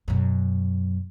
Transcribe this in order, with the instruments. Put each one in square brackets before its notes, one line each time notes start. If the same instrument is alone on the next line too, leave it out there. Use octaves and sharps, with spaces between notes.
[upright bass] F#2 B2